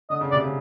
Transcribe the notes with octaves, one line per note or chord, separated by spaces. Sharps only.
D3 D#5
C#3
C3 D5
C#3